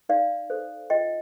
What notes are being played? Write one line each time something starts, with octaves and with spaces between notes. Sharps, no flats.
D#4 D5 F5
A4 C5
F4 D#5 G5